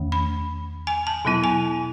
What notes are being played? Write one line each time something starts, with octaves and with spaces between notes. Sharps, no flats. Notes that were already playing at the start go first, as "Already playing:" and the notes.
Already playing: E2 D#3 A3 C#4
B5
G#5
A5
B2 F#3 B3 E4
G#5